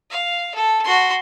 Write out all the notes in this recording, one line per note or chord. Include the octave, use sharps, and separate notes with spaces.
F5
A4
F#4 C6